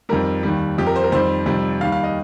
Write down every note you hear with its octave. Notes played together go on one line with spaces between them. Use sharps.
F2 D#3 G3 A#4
D#2 D#3 G3
F2 F3 G4
A#4
C5
A#4
F2 D#3 G3 C5
F2 C3 D#3 G3
D#2 D#3 G3 F5
F5
D#5